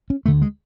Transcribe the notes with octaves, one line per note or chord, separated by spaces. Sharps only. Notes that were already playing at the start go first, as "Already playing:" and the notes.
C#4
D2 D3 A3
G#3